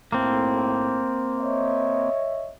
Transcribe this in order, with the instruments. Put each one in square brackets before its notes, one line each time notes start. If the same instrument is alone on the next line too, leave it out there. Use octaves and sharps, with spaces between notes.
[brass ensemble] B1 A2 [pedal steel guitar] A#3 C4
[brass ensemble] C#5 D#5 E5